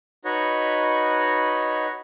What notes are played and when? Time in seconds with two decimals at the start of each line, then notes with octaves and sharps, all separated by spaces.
0.25 D#4 F#4 B4 C#5 D#5